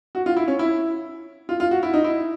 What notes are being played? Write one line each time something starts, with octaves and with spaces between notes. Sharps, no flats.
F#4
F4
E4
C#4
E4
F4
F4
F#4
E4
D#4
E4